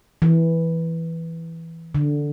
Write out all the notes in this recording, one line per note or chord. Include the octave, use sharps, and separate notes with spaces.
E3
D3